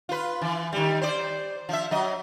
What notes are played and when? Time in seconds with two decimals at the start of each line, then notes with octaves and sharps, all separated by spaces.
0.09 F4 B4
0.42 E3
0.73 D#3 G3
1.02 C5 D5
1.69 F3 E5
1.91 F#3 D#5